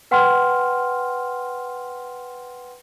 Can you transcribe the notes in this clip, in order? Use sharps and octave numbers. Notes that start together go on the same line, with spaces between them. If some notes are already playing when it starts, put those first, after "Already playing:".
B4 F#5 G5 C6 F6